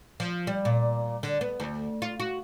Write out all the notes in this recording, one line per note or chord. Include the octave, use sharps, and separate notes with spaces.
F3
G3
A#2
D3
B3
D2
F4
F#4